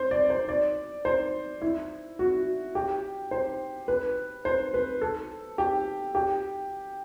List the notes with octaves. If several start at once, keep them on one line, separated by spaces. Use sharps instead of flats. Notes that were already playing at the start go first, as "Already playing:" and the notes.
Already playing: C5
D5
C5
D5
C5
E4
F#4
G4
C5
B4
C5
B4
A4
G4
G4